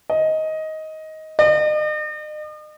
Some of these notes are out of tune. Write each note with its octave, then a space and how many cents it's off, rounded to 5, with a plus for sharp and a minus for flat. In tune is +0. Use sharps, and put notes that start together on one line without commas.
D#5 +15
D#5 -40